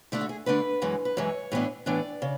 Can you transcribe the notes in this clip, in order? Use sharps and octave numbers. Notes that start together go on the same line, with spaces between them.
D3 A3 D4 E4
F#4
G#4
D3 A3 D4 B4
F#2 E3 G#3
B4
F#2 E3 G#3 C#5
A2 E3 B3 D4
A2 E3 B3 D4 D5
C#3